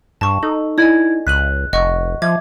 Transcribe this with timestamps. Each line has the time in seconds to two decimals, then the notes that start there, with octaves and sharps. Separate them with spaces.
0.21 G2 A5 C#6
0.43 D#4 A4
0.78 E4 D5 D#5 G#5 G#6
1.27 C#2 F#6 B6 D#7 F#7
1.73 F1 D#5 F#5 C#6
2.22 F3 E5 D6 G#6